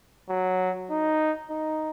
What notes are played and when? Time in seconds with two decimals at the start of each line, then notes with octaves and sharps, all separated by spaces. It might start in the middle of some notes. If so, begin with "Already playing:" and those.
0.29 F#3
0.90 D#4
1.50 D#4